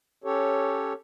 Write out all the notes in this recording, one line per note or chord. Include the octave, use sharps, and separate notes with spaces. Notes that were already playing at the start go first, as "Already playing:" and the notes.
C#4 G4 A4 C#5